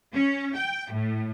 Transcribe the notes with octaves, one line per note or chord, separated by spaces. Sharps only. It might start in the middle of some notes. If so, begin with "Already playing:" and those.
C#4
G5
A2